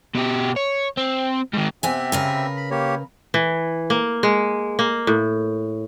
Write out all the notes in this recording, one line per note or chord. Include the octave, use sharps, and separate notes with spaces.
B2 G4
C#5
C4
G#2 D#3
C3 B3 C4 E5 G#5
C#3 A#4 B4
B5
A#3 G4 C#5
E3
A#3
G#3
A#3
A2